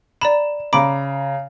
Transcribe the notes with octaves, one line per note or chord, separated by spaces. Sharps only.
D5 A#5 B5 E7
C#3 A#5 B5 D6 D7